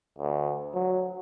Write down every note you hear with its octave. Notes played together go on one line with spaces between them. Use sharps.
D2
F#3